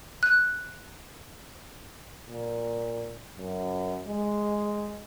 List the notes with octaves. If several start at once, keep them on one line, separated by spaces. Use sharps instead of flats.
F#6
A#2
F#2
G#3